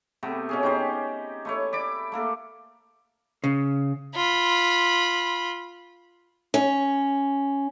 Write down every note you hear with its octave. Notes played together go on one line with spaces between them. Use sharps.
C3 A3 B3
B2 C#4 G#4
C#4 D#4 G4 C5
A3 E4 C#5
D5 B5 D6
A3 A#3 A4
C#3
F4 B5
C#4